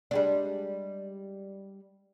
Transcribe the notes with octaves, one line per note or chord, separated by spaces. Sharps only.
G3 G#3 D4